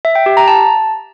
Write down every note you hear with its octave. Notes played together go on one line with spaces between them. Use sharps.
E5
G5
G4
A#5
A5